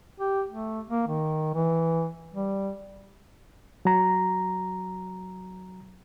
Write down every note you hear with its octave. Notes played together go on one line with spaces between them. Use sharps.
G4
A3
A#3
D#3
E3
G3
F#3 A#5